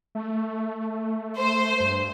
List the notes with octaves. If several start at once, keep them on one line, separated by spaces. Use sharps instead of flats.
A3
C5
G2